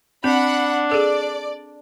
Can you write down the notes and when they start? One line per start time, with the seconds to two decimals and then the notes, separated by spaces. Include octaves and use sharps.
0.24 C4 D4 F#5 B5
0.91 G#4 A4 D5